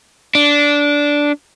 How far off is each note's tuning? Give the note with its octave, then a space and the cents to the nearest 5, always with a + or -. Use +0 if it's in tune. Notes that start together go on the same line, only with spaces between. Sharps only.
D4 -10